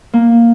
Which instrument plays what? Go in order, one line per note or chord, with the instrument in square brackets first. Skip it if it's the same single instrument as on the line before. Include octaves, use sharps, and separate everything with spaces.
[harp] A#3